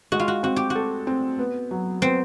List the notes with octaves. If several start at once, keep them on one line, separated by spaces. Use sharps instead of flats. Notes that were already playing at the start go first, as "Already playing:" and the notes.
G#3 F#4
F4
F#4
C4 F#4
G4
F#4
A4
C4
B3
F#3
B3 C4